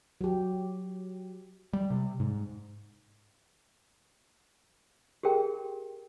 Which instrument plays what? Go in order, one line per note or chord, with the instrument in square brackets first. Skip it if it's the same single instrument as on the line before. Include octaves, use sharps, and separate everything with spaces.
[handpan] F#3 G4
[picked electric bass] G3
C3
G#2
[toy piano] G4 G#4 A#4 G5